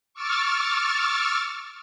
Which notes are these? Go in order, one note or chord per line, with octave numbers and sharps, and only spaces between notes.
C#6 D6 E6 F6 A6